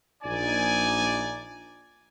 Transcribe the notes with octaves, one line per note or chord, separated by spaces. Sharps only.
A#1 D#4 D5 G#5